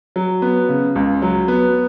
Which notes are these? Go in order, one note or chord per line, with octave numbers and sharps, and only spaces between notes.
F#3
B3
C#3
C#2
F#3
B3